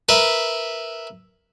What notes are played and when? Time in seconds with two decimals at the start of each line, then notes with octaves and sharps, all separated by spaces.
0.09 A#4 B4 E5